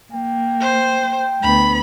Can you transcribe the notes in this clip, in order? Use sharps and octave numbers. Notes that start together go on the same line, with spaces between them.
A#3 G5
C5
D2 B3 B5